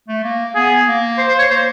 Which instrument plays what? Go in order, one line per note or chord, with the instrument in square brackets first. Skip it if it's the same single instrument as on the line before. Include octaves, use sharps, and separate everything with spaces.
[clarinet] A3
A#3
[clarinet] B3 [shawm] G#4
[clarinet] A#3
[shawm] C5
C5
C#5
[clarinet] A#3 [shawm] C5